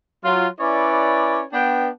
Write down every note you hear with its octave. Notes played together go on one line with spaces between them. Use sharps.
F#3 F4
C#4 E4 B4 C#5 D5
B3 D4 G5